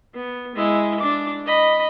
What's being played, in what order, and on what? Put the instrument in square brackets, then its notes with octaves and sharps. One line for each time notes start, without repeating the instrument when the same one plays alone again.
[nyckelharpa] B3
G#3 E4
D4 D6
D#5 B5